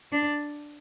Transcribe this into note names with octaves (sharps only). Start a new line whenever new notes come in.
D4